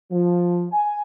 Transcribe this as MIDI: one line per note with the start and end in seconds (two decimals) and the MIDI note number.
0.11 0.66 53
0.72 1.01 80